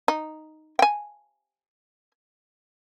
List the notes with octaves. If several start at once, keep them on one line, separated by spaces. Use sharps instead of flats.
D#4
G5 G#5